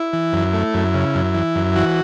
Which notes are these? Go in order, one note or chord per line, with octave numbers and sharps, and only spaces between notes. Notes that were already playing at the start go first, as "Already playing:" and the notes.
Already playing: E4
E3
F#2
A3
F#2
C#3
F#2
E3
F#2
E3 F#4